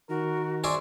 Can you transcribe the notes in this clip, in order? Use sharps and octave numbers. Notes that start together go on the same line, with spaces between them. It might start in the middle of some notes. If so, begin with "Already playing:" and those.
D#3 F#4 A#4
G#4 C5 D5 E5 C#6